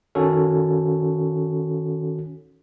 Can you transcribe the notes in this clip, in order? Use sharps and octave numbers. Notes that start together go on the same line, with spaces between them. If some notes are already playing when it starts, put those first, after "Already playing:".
D#3 C#4 F#4 A4